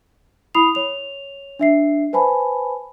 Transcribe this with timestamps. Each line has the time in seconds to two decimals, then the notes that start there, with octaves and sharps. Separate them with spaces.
0.55 E4 B5 D#6 C7 F7
0.75 C#5 F7
1.59 D4 E5 C7
2.13 B4 C5 G#5 A5 B5